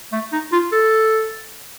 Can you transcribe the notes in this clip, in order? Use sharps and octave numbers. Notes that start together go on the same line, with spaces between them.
A3
D#4
F4
A4